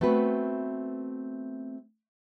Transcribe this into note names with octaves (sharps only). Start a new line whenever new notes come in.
A3 B3 C4 F#4 B4